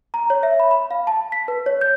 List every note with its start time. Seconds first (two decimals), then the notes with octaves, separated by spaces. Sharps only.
0.14 A#5
0.30 C#5
0.43 E5
0.60 B5
0.71 B5
0.91 F5
1.07 A5
1.32 B6
1.48 B4
1.66 C#5
1.81 G6